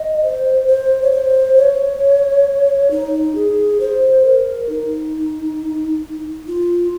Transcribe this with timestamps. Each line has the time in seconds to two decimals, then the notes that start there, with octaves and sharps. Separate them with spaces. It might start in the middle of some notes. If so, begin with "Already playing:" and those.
Already playing: D#5
0.23 C5
0.68 C5
1.02 C#5
1.12 C5
1.57 C#5
2.91 D#4
3.35 G#4
3.80 C5
4.25 A#4
4.69 D#4
6.47 F4